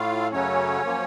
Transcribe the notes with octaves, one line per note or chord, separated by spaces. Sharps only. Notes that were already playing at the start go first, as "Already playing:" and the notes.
Already playing: A2 A3 F4 F5
F#2 C#3 F#3 A3 C#4 C#5
F#2 F3 A#3